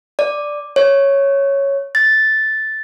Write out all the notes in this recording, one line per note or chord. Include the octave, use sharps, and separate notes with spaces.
D5
C#5
A6